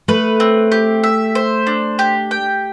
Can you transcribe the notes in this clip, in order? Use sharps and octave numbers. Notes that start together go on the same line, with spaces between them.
A3 B4
C4
G4
E5
C5
D4
G4
G5